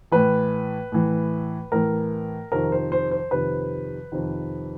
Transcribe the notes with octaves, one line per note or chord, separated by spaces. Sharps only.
A2 E3 B4
A2 E3
A2 E3 A#4
F2 C3 D#3 A#4
C5
C5
C5
F2 C3 D#3 B4
F2 C3 D#3